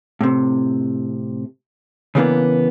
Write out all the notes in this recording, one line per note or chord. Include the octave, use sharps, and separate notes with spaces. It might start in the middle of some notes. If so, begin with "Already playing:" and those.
A2 C3
C#3 E3 G3 A#3 B3 D4